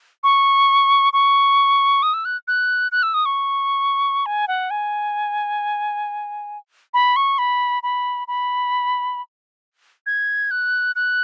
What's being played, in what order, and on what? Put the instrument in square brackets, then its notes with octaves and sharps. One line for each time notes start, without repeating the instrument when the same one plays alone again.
[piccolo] C#6
C#6
D#6
E6
F#6
F#6
F#6
E6
D#6
C#6
G#5
F#5
G#5
B5
C#6
B5
B5
B5
G#6
F#6
F#6